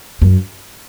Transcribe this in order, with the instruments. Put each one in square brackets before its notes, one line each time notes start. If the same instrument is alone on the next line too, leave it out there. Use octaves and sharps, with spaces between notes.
[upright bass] F#2